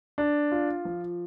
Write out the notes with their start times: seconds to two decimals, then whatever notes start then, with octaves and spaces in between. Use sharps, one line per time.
0.18 D4
0.52 F4
0.85 F3